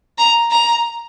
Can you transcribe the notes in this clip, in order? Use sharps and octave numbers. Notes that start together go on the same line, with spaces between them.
A#5
A#5